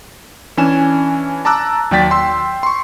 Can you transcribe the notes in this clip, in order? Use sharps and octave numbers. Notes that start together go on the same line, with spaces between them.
E3 C#4 D4 G#5 E7
A5 A#5 D6 E6 F#6
D#2 F#3 D5 G5 A6 B6
G5 C6 E6
C6 C#6